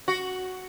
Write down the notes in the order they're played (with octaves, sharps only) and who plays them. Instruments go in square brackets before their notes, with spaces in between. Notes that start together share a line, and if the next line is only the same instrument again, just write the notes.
[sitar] F#4